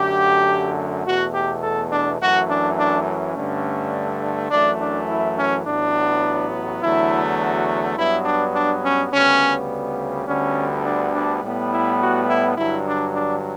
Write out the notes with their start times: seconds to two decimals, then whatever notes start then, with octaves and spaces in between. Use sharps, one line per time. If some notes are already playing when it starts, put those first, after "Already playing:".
Already playing: F#2 D3 A3 G4
1.06 E2 B2 A3 F#4
1.34 G4
1.63 A4
1.92 D4
2.20 F#2 E3 A3 F#4
2.50 D4
2.79 D4
3.07 C#4
3.36 G2 D3 A3
4.51 F#2 E3 A3 D4
4.80 D4
5.10 E4
5.38 C#4
5.67 A1 A2 F#3 B3 D4
6.82 E2 D3 F#3 A3 E4
7.40 F#4
7.97 G2 F#3 B3 E4
8.25 D4
8.55 D4
8.84 C#4
9.12 D2 C#3 G3 B3 C#4
10.28 D2 D3 G3 B3 C#4
10.85 D4
11.14 D4
11.43 A2 G3 B3
11.71 E4
12.01 F#4
12.29 E4
12.57 G2 D3 F#3 E4
12.87 D4
13.15 D4